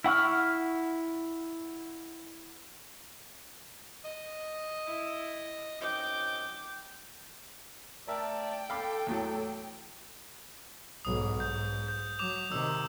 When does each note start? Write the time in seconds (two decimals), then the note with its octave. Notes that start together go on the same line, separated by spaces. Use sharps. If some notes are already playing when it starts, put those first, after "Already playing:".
0.04 E4 F#5 C#6 F6
4.04 D#5
4.86 E4
5.80 F#2 C4 D#4 G5 D6
8.08 A3 A#4 D5 E5 G5 A5
8.70 A4 F5 B5 D6
9.07 E2 A2 F#3
11.05 B1 G#2 D#6
11.40 G#2 G6
11.88 G6
12.19 F#3 D6 F7
12.52 C3 D#3 E6